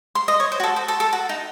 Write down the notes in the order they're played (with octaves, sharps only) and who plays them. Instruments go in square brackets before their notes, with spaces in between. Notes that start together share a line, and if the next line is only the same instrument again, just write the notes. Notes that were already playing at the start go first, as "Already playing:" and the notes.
[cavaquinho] C6
D#5
C#5
C5
F#4
A4
C5
A4
A4
F#4
D#4